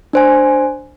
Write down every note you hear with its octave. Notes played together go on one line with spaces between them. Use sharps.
D4 C5 G#5